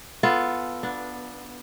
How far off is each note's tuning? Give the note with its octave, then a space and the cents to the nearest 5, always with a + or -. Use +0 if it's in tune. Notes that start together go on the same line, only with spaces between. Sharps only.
B3 +0 F4 -10 A4 +0
B3 -20 D4 +0